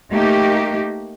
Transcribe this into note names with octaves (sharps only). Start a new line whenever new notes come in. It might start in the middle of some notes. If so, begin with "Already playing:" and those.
A3 A#3 D#4 G4